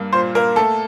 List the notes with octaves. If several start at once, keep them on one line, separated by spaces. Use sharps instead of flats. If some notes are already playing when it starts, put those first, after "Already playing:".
Already playing: G2 A#3
A#2 C5
A#3 A#4
A3 A4